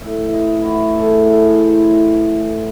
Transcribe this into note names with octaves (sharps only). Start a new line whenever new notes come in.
A2 E5
E3 E5
D#5
A2
E4
F#4
E3
A2 A4
G#4
A4
E3
A4
G#4
A2 A4
C5
E3
C#5
A2 D#5
E3
A2